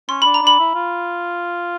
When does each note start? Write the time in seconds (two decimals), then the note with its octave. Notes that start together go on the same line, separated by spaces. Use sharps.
0.09 C#4 C6
0.22 D4 B5
0.34 A#5
0.42 D4
0.47 B5
0.59 E4
0.75 F4